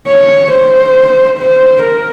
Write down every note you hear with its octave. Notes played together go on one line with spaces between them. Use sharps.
C#5
C5
C5
A#4